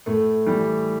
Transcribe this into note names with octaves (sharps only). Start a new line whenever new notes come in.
A2 A3
E3 G3